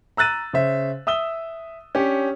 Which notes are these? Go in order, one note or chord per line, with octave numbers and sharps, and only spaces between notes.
A#5 E6 F#6 A6 D#7
C#3 C5 E5
E5 D#6 E6 G7
C#4 D4 G4 C#5